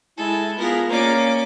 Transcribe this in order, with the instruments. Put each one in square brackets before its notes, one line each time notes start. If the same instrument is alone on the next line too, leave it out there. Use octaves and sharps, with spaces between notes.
[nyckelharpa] G#3 G#5 [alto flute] E4 [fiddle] A4
[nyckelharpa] B3 G#4 [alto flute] F4 [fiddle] A#4
[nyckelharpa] A#3 D5 [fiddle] C#4 D6